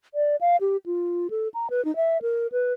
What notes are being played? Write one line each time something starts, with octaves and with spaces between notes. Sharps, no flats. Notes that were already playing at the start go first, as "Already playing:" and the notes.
D5
F5
G4
F4
A4
A#5
B4
D#4
E5
A#4
B4